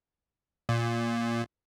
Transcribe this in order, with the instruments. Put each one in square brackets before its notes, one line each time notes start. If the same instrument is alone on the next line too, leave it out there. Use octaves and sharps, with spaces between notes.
[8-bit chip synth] A#2